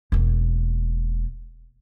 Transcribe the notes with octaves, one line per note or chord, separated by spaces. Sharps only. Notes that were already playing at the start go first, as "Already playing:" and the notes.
E1 A#3